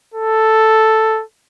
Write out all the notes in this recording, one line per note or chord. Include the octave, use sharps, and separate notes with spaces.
A4